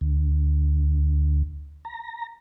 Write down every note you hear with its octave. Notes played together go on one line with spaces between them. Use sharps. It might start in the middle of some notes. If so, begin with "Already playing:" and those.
D2
A#5